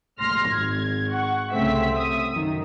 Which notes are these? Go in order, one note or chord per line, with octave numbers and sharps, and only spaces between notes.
C6 F6 A#6
G#1 G#6
F#5 C#6
C2 C#3 A3 C4 E5 B6
E5 D#6
F#2 D#3